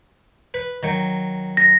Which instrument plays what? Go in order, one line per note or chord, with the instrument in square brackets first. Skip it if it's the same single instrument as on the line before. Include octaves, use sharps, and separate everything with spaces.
[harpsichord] B4
D#3 F#3
[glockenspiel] A#6